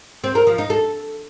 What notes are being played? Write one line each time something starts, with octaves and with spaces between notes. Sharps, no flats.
C4
A#4
F3
D#4
A4